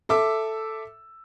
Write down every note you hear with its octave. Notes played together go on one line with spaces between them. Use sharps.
A4 E5 D6 E6